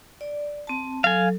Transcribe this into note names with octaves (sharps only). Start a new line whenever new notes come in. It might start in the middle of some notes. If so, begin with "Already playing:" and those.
D5
C4 A5
F#3 A4 F5 G#5